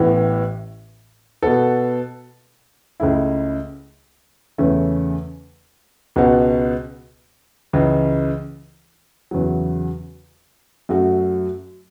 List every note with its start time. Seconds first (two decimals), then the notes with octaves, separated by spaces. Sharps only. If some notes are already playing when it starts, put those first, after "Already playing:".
Already playing: A1 A2 E3 B3
1.43 B2 B3 A4
3.00 C#2 C#3 A3 E4
4.58 E2 C#3 A3 C#4
6.16 C#2 B2 B3 F#4
7.73 C#2 C#3 E3
9.31 E2 C#3 F#3
10.89 F#2 F#3 A3 F#4